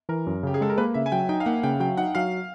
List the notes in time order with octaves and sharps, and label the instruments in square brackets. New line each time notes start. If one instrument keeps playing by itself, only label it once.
[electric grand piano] E3 [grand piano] A#4
[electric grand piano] F#2
[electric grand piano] C#3 [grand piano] G4
[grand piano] G#4
[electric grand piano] G#3 [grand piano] A4
[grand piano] A#4
[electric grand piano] A#3 [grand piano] B4
[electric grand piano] C#3 [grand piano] E5
[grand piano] G#5
[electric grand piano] F#3 [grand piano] G5
[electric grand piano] D#4 [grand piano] G5
[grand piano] F5
[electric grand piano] A#3 [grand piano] F#5
[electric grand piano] C#3 [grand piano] G5
[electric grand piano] F#3 [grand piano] G5
[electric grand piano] D#4 [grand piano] F#5
[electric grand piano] F#3 [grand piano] F5